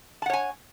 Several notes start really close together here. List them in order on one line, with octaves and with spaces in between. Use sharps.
A5 F#5 C#5 G#5